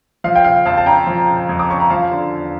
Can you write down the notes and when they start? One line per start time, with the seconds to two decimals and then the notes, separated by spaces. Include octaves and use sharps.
0.24 F3 F5
0.36 G5
0.44 C#3 F5
0.66 F2 F5 A5
0.77 A5
0.86 C#4 G5 A#5
1.07 F3
1.28 C#3
1.49 F2
1.59 D6
1.70 C#4 C#6
1.80 A#5
1.90 F3 F5 A5
2.11 D3
2.33 E2